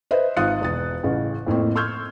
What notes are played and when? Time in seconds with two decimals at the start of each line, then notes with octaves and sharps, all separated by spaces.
0.11 B4 C5 D#5 E5
0.36 G#1 F4 D#6 F#6 A6 C#7
0.61 E1 D#6 A6
1.04 A1 C#3
1.47 F2 A2 A#3 C4
1.76 C6 C#6 E6 F6 G6 G#6